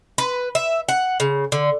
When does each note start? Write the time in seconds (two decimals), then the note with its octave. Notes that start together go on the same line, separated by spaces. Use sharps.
0.18 B4
0.55 E5
0.89 F#5
1.20 C#3
1.52 D3